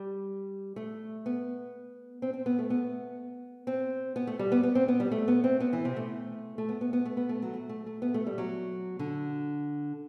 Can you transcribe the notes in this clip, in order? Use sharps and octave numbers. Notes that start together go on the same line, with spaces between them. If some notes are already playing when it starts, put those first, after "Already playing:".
Already playing: G3
A3
B3
C4
C4
B3
A3
B3
C4
B3
A3
G3
B3
B3
C4
B3
G3
A3
B3
C4
B3
E3
C3
A3
A3
B3
B3
B3
A3
B3
A3
F#3
A3
A3
A3
B3
A3
G3
F#3
D3